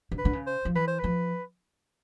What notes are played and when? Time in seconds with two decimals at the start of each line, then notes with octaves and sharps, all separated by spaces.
0.12 D3
0.19 B4
0.25 D3
0.33 C#3
0.47 C5
0.65 F3
0.75 E3 B4
0.88 C5
1.00 F3 B4